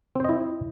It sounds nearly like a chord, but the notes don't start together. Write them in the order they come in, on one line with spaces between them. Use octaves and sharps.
C4 C5 D#5 E4